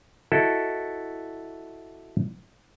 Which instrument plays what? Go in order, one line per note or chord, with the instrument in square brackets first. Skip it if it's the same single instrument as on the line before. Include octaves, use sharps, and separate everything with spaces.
[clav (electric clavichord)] E4 F#4 A4 D#5